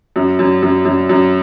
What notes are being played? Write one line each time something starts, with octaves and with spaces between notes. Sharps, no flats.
F#2
F#2
F#2
F#2
F#2